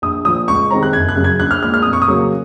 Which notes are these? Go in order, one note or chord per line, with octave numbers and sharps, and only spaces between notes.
A#1 D#6
A#2 F3 D#6
C#2 C#6
C3 D#3 G#3 C4 A#5
F#6
F#1 G#6
F#6
F#2 C#3
G#6
A#1 F#6
F6
A#2 G#3 F6
F6
F2 D#6
C#6
D#6
C#3 F#3 A#3